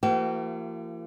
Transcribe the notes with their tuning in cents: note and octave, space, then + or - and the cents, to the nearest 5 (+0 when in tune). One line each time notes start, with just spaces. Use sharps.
E3 +45 A#3 -35 G4 -45